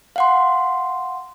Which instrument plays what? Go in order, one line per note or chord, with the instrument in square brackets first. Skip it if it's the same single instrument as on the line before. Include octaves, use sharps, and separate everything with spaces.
[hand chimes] F5 F#5 C6